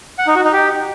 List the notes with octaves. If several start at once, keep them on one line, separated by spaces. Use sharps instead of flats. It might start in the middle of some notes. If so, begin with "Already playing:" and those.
F#5
D#4
F#4
D#4
G4